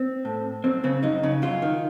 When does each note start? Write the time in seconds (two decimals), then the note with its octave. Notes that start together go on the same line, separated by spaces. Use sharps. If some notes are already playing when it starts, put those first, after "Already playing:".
Already playing: C4
0.25 A2
0.64 F#2 C4
0.84 C#3 C4
1.03 F#2 D#4
1.23 C#3
1.42 F#2 F4
1.62 D#3